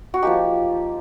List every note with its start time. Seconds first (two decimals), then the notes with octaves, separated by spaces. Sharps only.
0.14 F#4
0.22 F3 A#3 D#4 G4